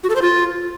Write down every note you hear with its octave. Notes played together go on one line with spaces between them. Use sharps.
F#4
A4
C5
F4